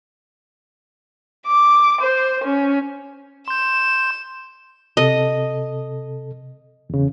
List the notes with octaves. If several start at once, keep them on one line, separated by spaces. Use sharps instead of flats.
D6
C5
C#4
C6 G6 E7
C3 A4 D#5
E2 C#3